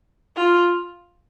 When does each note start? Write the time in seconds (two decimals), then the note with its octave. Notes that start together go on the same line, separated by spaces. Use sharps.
0.37 F4